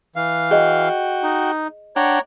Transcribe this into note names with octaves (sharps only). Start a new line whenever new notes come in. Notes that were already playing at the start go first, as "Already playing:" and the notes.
E3 F5
F#4 G#4 D#5 G5
D#4
D4 C#5 F#5 G5 A#5